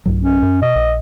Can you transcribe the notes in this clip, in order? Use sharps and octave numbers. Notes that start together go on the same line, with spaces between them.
B1 G2 F#3
C#4
F#2
B2 D#5
A#1